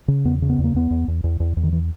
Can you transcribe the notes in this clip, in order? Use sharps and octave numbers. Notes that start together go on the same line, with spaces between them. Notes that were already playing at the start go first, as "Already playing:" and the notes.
C#3
E2 B3
C#3
B3
E2
A#3
E2 B3
E2
E2
E2
E2
E2
D#3
E3